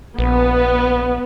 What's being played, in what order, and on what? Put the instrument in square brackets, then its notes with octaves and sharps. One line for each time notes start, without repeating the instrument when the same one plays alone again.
[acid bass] A#1 [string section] B3